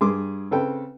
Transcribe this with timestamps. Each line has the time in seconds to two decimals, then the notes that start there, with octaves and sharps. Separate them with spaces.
0.01 G2 G#4 C6 D6
0.51 C#3 C4 A4 B4 G5